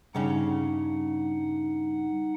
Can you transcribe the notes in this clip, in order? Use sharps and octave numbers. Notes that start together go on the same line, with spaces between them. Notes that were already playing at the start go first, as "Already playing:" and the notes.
G2 C#3 C#4 D#4 F#5